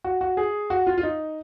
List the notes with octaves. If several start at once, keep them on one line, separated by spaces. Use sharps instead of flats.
F#4
F#4
G#4
F#4
F4
F4
D#4